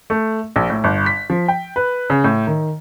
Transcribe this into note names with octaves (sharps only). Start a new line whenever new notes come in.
A3
A#1
A2
G1
B6
F3
G5
B4
C#3
A2
D#3